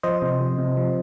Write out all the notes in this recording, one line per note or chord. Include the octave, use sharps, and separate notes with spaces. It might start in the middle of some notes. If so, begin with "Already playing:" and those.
F3 C5 D#5
C3
F3
C3
F3